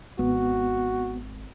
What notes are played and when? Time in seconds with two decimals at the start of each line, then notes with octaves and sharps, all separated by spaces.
0.19 G#1 B3 F#4